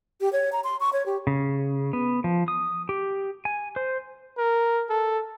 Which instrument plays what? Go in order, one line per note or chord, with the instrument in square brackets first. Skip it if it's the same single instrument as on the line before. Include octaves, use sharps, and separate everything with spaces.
[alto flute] G4
C#5
A#5
C6
C#6
C#5
G4
[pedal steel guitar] C#3
B3
F3
D#6
G4
G#5
C5
[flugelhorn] A#4
A4